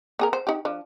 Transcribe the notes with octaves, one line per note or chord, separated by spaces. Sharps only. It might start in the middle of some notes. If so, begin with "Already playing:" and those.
A#3 G#4 A#4
C5
D#4 G4
F3 D4